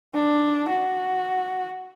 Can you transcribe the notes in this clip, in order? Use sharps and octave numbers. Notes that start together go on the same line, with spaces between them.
D4
F#4